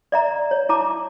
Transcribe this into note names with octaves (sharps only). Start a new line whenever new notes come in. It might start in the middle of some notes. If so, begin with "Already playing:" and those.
D5 E5 A#5
C#5
E4 A5 A#5 D6